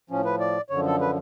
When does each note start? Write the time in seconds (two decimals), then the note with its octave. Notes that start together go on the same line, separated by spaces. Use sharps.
0.10 A2 F3 C#4
0.25 B4
0.40 D5
0.70 F#2 D3 F3 C#5
0.86 A4
1.01 B4